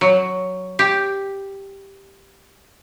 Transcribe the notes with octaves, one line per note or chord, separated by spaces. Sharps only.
F#3
G4